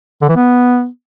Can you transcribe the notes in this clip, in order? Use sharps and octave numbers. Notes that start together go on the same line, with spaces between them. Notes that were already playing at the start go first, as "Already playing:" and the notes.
D3
E3
B3